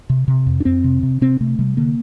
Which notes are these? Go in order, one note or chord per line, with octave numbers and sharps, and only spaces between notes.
C3
C3
F2
D4
F2 C4
C3
C3
C3 C4
C3 A3
C3 G3
D3 A#3